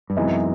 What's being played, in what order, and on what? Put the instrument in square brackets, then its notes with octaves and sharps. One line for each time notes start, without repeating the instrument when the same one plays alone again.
[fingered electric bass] G2
[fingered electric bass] F#2 [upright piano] C3 E3 G#3 B3 D#4